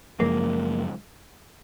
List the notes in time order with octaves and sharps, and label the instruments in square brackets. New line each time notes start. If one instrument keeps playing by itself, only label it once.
[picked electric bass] F#2 C#3 F3 G#3 [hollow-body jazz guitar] A#3